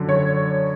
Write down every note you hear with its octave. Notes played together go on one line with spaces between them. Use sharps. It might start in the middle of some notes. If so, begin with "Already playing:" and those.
Already playing: F#2 D3
C#5